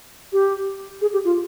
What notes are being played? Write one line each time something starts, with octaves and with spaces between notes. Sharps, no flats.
G4
G#4
G4
F4